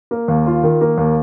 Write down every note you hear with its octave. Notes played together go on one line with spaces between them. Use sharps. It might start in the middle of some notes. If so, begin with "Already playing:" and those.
A#3
D#2
F4
D#3
A#3
D#2